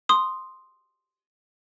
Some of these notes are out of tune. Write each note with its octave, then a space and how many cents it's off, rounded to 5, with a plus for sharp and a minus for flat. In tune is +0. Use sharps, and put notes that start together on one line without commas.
C6 +0 D#6 -10